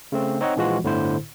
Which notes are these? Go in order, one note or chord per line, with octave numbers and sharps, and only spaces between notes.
C#3 A3 C4
C4 D#4 C#5 D#5 F#5
A#1 E3 F3 G#3 F4 F#4
G1 A2 D3 E4 C5